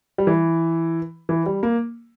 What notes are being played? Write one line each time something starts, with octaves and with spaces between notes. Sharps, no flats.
G3
E3
E3
G3
A#3